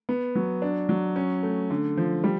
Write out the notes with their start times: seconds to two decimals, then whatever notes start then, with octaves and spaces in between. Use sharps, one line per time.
0.09 B3
0.35 F#3
0.62 D4
0.89 F#3
1.16 C#4
1.43 A3
1.70 D3
1.97 F3
2.24 G3